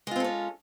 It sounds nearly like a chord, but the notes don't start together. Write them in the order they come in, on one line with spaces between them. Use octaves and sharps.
G#3 F4 C4 A4 C#4